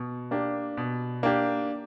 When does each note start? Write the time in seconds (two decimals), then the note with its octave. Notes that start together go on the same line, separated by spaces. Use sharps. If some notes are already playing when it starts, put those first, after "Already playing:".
Already playing: B2
0.31 A#3 D4 G4
0.77 B2
1.23 A#3 D4 G4